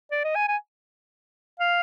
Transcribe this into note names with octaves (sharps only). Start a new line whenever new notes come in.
D5
D#5
G#5
G#5
F5